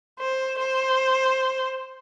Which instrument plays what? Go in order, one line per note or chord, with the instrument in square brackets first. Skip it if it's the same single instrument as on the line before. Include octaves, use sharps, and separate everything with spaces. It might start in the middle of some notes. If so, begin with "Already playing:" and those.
[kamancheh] C5
C5